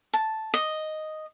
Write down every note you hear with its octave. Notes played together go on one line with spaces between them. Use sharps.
A5
D#5